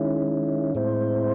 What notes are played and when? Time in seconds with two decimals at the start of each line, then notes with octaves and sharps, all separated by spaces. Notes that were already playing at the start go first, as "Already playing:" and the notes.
Already playing: D#3 G#3 C#4 E4
0.75 A2 G#3 C4 E4 C5